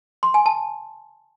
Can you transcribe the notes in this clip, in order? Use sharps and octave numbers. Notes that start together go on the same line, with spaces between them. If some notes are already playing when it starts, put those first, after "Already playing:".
C6
G#5
A5